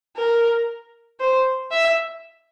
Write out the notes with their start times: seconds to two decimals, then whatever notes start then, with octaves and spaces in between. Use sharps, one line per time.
0.17 A#4
1.20 C5
1.71 E5